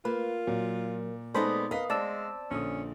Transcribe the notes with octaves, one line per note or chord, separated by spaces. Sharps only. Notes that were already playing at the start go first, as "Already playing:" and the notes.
A#3 F4 B4
A#2 F#3
G#3 B3 D#4 A4 C5 D5 B5
A#4 B4 D#5 F5 B6
G#3 C4 D5 A5 E6
A#1 D3 C#4 D#6